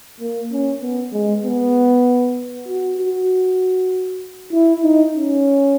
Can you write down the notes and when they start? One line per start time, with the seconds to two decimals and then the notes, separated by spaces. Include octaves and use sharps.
0.20 A#3
0.52 C#4
0.82 B3
1.12 G#3
1.44 B3
2.68 F#4
2.98 F#4
4.52 E4
4.83 D#4
5.14 C#4